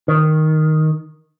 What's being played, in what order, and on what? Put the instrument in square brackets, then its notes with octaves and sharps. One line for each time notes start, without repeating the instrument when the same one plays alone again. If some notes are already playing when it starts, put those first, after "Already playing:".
[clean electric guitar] D#3